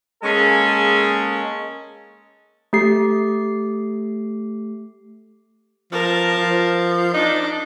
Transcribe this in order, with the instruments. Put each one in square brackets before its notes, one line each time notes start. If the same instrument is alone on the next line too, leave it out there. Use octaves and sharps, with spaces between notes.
[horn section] G#3 A#3 C#4 G#4 A4
[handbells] A3 G4 C7
[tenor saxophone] F3 [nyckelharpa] A#4 A5
[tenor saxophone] F3
[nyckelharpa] D4 [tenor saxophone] D#4